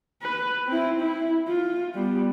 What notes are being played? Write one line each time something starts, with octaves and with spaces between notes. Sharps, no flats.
B4
C4 E4
E4
F4
G3 B3